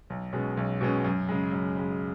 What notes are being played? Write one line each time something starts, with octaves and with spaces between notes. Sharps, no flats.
B1
B2 G#3 C#4
B1
B2 G#3 C#4
F#2
C#3 G#3
F#2
C#3 G#3